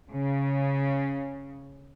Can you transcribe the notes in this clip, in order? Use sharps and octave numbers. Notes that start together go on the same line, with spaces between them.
C#3